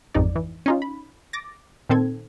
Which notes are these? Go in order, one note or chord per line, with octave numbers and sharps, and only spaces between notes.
A1 F2 G#2 D#4 D5
E3
C#4 D#4 F4
B5
D6 A6 A#6
A#2 D#3 C4 A4 G#6